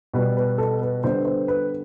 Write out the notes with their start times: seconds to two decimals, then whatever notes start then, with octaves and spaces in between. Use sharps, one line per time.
0.14 B2 G3 B3 B4
0.37 B4
0.58 A4
0.82 B4
1.04 D3 G3 B3 C5
1.25 C5
1.48 B4